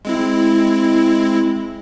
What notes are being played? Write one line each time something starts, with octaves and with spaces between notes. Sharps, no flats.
G#3 C4 E4